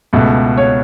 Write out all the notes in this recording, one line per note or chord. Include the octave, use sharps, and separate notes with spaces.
C#2 B2 A3
C#5